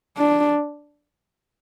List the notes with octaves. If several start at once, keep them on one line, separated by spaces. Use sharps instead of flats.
D4